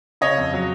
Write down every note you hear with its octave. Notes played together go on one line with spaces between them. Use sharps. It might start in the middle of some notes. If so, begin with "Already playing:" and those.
C#3 C#5 D#5
F2
F#3